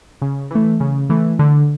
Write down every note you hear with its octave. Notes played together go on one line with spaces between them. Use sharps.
C#3
E3 A3
C#3
E3 A3
D3